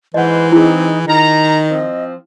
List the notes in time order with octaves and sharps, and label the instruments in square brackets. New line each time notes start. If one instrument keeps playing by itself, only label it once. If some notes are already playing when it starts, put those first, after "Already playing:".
[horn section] G#2 C5 [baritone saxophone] E3 [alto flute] B4 [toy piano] D#5 F#5
[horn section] G#3 C4 [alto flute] D#4 [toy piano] E4 G#4
[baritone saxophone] D#3 [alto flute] D#5 [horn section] A#5
[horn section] F3 C4